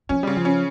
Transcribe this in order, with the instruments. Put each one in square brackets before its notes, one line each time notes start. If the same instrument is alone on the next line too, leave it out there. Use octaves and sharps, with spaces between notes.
[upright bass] F3 [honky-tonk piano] C#4
[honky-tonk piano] C#3 [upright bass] G3
[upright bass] F3
[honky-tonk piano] C#4